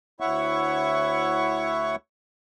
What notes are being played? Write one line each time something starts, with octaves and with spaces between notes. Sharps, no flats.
D2 E4 C#5 E5 F#5 C#6